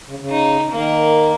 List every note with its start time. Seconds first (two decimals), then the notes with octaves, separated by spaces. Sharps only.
0.09 C#3
0.19 C#3
0.30 D#4
0.72 D#3 A#3